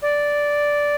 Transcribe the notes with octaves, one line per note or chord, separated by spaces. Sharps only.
D5